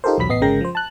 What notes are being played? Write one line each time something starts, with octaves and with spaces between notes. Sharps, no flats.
D#4 F4 G4 A4 A#4 C5
B1 E2 F#3 B5 B6
A1 B3 D#5 C7
G1 C#3 G#3 A#4 G5 A#6
F3 C5
A5 F#6